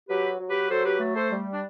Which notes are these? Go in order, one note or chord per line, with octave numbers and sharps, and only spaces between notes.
F#3 G4 B4
F#3
G4 B4
F#3 A4 C5
G4 B4
A3
A4 C5
G3
D4